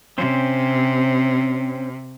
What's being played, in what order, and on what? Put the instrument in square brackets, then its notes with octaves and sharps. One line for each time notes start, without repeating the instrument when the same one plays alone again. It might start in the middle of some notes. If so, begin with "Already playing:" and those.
[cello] C3 [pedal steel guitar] C4 C#4 C5